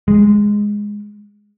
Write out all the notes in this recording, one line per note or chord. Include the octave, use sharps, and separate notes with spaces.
G#3